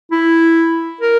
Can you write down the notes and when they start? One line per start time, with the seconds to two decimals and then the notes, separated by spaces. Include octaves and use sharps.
0.12 E4
1.01 A#4